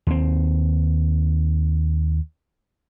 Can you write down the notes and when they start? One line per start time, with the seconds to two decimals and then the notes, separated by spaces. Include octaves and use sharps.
0.07 D#2 C4